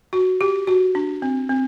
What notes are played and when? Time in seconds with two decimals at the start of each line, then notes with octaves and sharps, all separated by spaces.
0.13 F#4
0.41 G4
0.67 F#4
0.95 D4
1.22 C4
1.49 C4